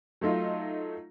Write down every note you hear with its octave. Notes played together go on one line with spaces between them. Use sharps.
F#3 A3 D#4 F4